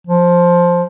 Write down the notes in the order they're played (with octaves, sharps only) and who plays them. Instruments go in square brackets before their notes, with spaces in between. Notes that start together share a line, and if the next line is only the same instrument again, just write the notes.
[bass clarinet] F3